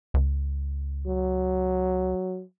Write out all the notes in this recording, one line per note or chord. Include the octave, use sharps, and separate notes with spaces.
C#2
F#3